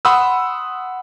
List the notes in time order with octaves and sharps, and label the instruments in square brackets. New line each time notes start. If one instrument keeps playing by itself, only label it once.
[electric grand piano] F#5 B5 C6 D#6 E6